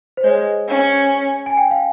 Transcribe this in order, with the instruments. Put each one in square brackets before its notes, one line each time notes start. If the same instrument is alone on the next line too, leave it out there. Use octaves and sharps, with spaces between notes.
[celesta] C5
[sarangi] G#3 [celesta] C#5
[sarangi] C#4
[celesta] G#5
G5
F5